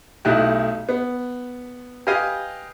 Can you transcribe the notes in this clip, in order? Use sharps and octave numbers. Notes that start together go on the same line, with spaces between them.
B1 A2 D#4 E4 G4 F#6
B3
G4 B4 D#5 F5 G#5